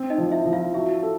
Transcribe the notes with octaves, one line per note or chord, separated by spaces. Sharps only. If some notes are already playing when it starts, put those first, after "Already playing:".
Already playing: C4
D#4 D#5
F3
E4 E5
F3
F4 F5
E4 F#4 E5
A4